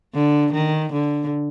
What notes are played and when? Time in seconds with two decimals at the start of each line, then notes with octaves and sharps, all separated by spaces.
0.15 D3
0.53 D#3
0.93 D3